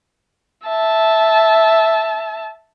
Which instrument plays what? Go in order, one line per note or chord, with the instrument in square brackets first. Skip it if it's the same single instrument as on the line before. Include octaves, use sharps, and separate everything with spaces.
[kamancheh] E5 A5